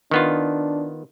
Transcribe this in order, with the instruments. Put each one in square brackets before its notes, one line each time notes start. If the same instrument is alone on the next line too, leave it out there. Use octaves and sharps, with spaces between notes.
[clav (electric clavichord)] D#3 B3 F4 [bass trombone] D4